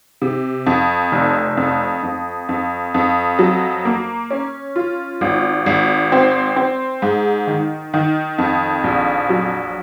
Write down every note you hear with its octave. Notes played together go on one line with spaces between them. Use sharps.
C3
F2
F1
F2
F2
F2
F2
F#3
A#3
C#4
F4
G#1
G#1
C4
C4
G#2
D#3
D#3
F2
A#1
F#3